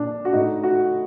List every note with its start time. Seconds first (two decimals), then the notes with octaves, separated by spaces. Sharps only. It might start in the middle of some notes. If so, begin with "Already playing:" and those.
Already playing: A#2 D4
0.25 F#4
0.33 A2 D#4
0.63 F#4